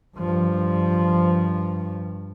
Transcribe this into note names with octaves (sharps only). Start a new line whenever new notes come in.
G2 F3